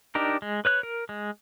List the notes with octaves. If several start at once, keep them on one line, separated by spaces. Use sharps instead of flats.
D4 D#4 G4 A#4
G#3
B4 C#5 F#6
A#4
G#3